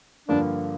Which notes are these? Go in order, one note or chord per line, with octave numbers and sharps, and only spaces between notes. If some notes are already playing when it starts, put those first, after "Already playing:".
G2 D3 F3 A#3 D4